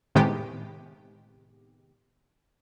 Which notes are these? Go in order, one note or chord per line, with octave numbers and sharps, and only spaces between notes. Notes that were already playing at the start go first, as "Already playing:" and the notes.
A2 C3 D#3 G#3 B3 G4